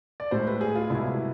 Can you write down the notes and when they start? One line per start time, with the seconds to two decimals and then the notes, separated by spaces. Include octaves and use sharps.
0.20 D5
0.31 A2 G#3 C5
0.47 B4
0.61 G#4
0.75 F4
0.90 C2 B2 G#3 E4